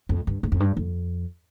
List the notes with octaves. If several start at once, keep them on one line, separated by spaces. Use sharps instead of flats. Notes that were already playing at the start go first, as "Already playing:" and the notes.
F2
G2
G#2
F2
G2
F2